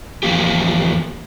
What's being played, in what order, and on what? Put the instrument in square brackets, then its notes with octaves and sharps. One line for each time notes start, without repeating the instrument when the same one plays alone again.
[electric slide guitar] E2 F3 A#3 G4